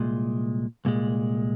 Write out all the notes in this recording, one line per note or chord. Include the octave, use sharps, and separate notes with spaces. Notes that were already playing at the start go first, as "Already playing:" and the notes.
Already playing: C2 A#2 G#3
C2 A#2 G#3